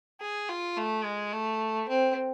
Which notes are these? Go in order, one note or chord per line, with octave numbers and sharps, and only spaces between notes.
G#4
F4
A3
G#3
A3
C4